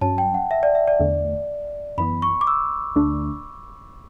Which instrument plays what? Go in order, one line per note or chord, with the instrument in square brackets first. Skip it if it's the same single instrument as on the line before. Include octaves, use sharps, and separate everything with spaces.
[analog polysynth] G2 F#3 C#4 [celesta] A5
[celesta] G5
F#5
E5
D5
E5
D5
[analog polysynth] E2 D3 A3
[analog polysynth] F#2 E3 B3 [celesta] B5
[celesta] C#6
D6
E6
[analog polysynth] D2 D3 A3 D4